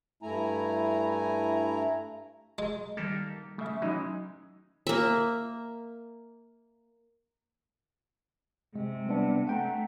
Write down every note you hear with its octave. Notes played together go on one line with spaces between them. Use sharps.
G2 A3 E4 G#5 A#5
G#3
D#3 G3 A#3 G4 A4
C#3 A3 E5
E3 F#3 G#3 C#4 D#4
A#3 E5
C3 G#3
G3 B3 D4
A3 F#5 G5 A#5